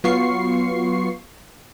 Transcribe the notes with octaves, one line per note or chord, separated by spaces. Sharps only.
F#3 B3 F4 C#6 C7